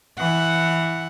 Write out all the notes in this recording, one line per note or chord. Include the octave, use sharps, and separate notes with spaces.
E3 F#5